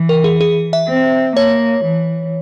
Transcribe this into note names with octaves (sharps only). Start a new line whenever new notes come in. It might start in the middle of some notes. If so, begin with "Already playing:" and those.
Already playing: E3
A#4
G#4
G#4
E5
C4
A#3 C#5
E3